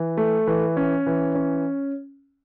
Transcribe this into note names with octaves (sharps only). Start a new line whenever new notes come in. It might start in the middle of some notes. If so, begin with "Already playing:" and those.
Already playing: E3
A3
E3
C#4
E3
C#4